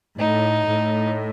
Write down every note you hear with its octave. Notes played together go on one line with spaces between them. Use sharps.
A2 D#4
A2